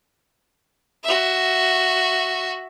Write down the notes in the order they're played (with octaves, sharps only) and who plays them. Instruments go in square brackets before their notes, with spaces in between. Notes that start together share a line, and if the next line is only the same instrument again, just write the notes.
[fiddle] F#4 E5